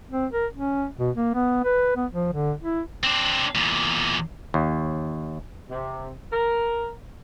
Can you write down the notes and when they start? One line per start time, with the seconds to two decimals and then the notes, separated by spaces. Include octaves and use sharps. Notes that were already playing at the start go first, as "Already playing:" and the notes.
0.12 C4
0.32 A#4
0.53 C#4
0.99 B2
1.16 A#3
1.34 B3
1.64 B4
1.96 B3
2.11 F3
2.32 D3
2.62 E4
3.03 C4 D4
3.55 E2 A#2
4.54 D#2
5.70 C3
6.32 A#4